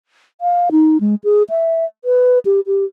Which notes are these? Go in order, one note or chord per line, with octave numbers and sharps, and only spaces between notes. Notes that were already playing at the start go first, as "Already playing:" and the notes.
F5
D#4
G#3
G#4
E5
B4
G4
G4